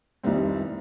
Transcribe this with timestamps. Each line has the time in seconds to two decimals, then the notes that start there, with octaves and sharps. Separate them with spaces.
0.23 F1 C2 D#3 G3 C4